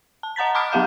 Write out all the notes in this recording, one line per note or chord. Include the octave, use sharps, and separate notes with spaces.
A5
D#5 F#5 A#5 A6 B6
A5 B5 D6 D#6 F6 D7
F#3 B3 G4 F5 F#5 G6